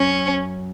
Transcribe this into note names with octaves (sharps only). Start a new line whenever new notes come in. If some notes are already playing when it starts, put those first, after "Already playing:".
Already playing: F#2 C#4